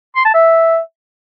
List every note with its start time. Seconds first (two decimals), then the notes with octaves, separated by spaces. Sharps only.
0.16 C6
0.25 A5
0.34 E5